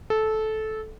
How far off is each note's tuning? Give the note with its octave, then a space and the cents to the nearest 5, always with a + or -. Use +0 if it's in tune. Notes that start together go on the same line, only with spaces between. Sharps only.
A4 -15